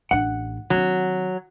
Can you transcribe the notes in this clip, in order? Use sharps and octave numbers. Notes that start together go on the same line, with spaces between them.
A1 D4 F#5
D#3 F#3 C4